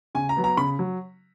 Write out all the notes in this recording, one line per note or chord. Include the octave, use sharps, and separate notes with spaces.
C#3 G#5
A#5
F#3 B3
A#5
C#3 B5
F#3